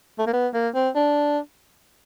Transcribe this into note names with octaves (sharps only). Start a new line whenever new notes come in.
A3
A#3
B3
A#3
C4
D4